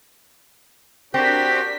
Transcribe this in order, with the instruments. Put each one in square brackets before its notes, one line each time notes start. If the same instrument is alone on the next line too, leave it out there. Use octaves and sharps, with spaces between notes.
[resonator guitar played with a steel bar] C4 [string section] D4 A#4 B6 [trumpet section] F#4 [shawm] G4